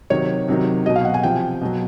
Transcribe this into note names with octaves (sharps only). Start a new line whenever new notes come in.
C3 D#3 F#3 C#5
C3 D#3 F#3
B2 F#3 D#5
F5
F#5
G#5
C3 F3 G5
B2 F#3